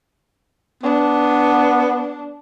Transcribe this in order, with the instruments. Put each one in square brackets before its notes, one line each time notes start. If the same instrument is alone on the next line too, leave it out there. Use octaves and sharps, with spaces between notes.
[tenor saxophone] B3 [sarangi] D4